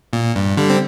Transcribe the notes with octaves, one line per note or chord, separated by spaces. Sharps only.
A#2
G2
D3 G3
C4